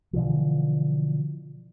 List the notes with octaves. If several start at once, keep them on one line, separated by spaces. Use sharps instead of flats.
B2 D3 E3 F3